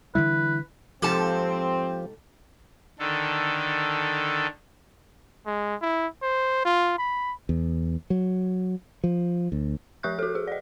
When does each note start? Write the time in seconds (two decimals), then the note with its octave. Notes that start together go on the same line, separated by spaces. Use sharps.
0.15 D3 E3 G3 E4 B4
1.02 G#2 F3 C4 G4 A4 A5
2.99 D3 D#3 A4
5.46 G#3
5.82 E4
6.23 C5
6.65 F4
6.98 B5
7.49 E2
8.10 F#3
9.04 F3
9.52 D2
10.03 F3 G4 E5 C#6 F#6 G6
10.19 F#4 A4
10.35 G#4
10.47 D5 D#5